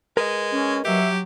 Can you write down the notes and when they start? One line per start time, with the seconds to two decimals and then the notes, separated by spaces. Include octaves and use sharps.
0.17 G#3 A#4 B4 D#5
0.52 C#4
0.85 F#3 G4 E5